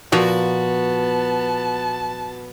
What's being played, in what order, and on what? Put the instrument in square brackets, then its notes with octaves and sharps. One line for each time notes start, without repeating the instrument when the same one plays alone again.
[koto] A#2 F3 [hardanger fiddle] B3 [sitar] F#4 [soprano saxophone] A5